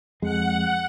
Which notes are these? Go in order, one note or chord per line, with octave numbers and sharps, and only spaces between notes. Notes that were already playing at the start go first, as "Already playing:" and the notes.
F2 G#3 F#5